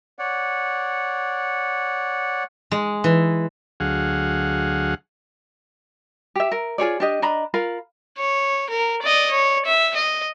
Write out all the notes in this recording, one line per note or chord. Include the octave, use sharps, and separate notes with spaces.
C#5 D5 F#5
G#3
E3
D2 F#3 G#4 F5 F#5
G4 E5
A#4
F4 G#4 C#5 D5
D4 G4 D#5
D4 D#5 A#5 B5
F4 A#4 F5 B5
C#5
A#4
D5 D#5
C#5
E5
D#5